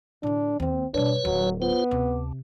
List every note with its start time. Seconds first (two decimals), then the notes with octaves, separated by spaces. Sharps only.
0.23 A2 D3 D4
0.60 D#2 A#3 C4
0.94 G2 B2 D4 B4 C#5
1.25 D1 F#3
1.62 B3 F4 C5
1.91 D2 C3